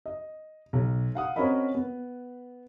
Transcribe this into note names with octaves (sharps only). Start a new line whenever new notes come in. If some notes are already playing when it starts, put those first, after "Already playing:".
D#5
B1
F5 F#5 D#6
C4 C#4 F#4 A#4 D#5 B5
B3